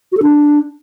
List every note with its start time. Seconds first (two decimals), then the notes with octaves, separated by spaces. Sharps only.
0.12 F#4
0.17 A4
0.22 D4